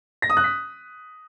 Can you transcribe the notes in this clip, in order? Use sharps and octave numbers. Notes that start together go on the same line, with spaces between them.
A#6
D#6
F#6
B6